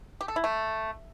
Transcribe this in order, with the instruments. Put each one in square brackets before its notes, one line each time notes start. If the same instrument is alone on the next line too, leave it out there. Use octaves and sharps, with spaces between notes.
[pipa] G4
A4
E4
A3